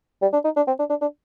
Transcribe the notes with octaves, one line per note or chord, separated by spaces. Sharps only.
G3
D4
D#4
D4
C4
D4
D4
D4